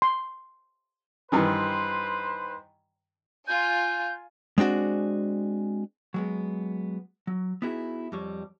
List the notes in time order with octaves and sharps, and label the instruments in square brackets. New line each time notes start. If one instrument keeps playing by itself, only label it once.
[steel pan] C6
[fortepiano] G2 D#3 E3 [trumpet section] B4 C5 C6
[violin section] F4 G#5 [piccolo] G6
[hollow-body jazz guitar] G#3 C4 D4 F#4 G#4
F#3 G#3 B3
F#3
B3 D#4 E4 F#4 G#4
F2 G3 C#5